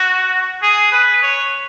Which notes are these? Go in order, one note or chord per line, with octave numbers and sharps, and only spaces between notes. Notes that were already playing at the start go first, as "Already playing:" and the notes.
Already playing: F#4
G#4
B4
C#5